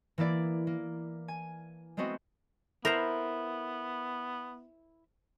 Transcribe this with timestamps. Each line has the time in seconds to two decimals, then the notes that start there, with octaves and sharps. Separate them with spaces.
0.18 E3 A#3 E4 D5
0.67 A#3
1.28 G#5
1.97 G#3 A3 B3 C4 F#4 D#5
2.85 B3 E4 A#4 C5 A#5